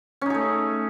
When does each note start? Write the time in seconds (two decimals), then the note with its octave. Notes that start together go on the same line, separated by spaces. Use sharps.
0.21 C#4
0.26 D#4
0.30 G#4
0.34 A3